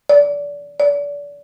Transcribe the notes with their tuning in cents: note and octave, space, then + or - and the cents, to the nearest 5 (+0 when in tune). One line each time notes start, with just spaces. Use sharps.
D5 -25
D5 -30